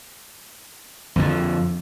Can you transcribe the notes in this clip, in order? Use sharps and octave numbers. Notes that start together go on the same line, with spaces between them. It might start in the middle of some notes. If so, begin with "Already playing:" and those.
F2 D3 F3